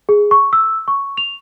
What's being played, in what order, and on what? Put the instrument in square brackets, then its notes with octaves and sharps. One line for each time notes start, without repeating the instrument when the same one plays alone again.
[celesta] G#4
C#6
E6
C#6
F7